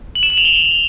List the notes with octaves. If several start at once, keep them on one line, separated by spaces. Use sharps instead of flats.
F#7
E7
F#7
F7
G7